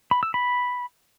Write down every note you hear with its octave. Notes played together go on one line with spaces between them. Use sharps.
B5
E6
B5